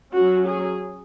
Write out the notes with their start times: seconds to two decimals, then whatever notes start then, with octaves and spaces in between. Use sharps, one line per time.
0.15 F#3 C#4 F#4
0.48 G#4